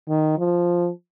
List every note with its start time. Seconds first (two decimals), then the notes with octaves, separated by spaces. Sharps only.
0.09 D#3
0.38 F3